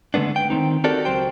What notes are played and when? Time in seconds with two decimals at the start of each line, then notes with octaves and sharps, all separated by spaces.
0.14 D3 G#3 A3 B3 D4
0.36 G5
0.50 D#3 E3 C4 D#4
0.84 C4 F#4 G4 A4 A#4 D5
1.05 C#2 F#3 C5 G5